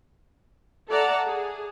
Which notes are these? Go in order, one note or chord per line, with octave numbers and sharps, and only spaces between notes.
A4 D5 E5 F#5 A5 A#5
G#4